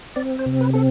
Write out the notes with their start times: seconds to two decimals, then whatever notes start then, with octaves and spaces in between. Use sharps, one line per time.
0.16 C4 D5
0.39 C5
0.46 C3
0.61 B4
0.74 C4 A4